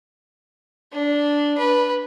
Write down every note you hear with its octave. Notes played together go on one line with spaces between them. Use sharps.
D4
B4